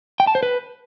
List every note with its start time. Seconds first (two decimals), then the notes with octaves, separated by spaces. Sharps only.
0.20 G5
0.27 A5
0.35 C5
0.43 B4